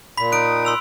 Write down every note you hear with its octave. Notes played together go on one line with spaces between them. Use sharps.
A#2 B5 B6
D#4 D#6 F#6 D7
C6 E6 F7